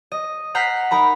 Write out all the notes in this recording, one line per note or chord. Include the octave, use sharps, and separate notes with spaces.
D#5
F#5 A#5 F6 G6 B6 C7
D#4 A#4 A#5 B5